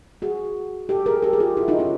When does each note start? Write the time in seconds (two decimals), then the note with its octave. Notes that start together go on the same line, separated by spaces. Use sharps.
0.22 F#4 G#4
0.89 G4 A4
1.06 G#4 A#4
1.22 G4 A4
1.33 G#4
1.40 F4 G4
1.57 E4 F#4
1.68 D#4 F4
1.79 C#4 D#4